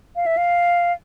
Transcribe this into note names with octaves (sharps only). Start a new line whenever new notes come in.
F5
E5
F5